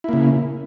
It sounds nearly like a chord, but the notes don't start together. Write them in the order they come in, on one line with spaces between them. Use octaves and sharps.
E4 A#3 C#3